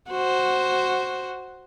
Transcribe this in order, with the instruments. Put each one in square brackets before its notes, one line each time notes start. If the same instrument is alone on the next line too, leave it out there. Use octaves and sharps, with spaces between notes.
[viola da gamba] F#4 C5